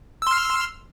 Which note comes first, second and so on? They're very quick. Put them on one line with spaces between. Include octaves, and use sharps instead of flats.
E6 C6 F6